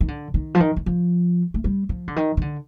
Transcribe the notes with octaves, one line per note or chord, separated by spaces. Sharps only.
D#3
D3
D#3
F3
D#3
D#3
F3
A3
G3
F3
D3
D#3
D#3
D3